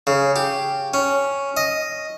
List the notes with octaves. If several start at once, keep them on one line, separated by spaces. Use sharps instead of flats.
C#3
G4
C#4
D#5